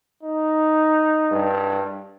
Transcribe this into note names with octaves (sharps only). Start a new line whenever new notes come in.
D#4
G2